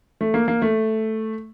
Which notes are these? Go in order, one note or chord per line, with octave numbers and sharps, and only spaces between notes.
A3
A#3
A#3
A3